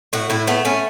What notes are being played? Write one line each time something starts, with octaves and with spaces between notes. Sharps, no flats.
A2 F#4
A2 E4
A3 B3
A3 C#4